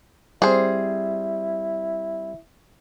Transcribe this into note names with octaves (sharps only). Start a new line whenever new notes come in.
G3 C4 E4 G#4 C5